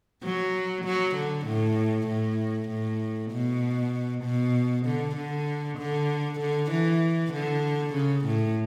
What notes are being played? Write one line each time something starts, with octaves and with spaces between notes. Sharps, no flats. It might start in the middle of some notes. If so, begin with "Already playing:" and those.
F#3
F#3
D3
A2
A2
A2
B2
B2
D3
D3
D3
D3
E3
D3
C#3
A2